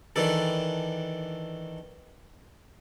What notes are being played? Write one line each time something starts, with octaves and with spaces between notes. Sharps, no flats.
D#3 E3 D4 A4